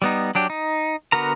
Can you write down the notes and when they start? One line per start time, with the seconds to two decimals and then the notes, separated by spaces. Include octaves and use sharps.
0.02 G3 B3 D#4
0.35 F#3 D4 G4
0.50 D#4
1.12 D3 B3 F#4 A#4 A#5